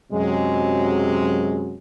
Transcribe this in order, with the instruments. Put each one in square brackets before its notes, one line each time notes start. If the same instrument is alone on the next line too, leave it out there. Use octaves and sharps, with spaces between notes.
[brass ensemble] F#2 C3 F#3 G#3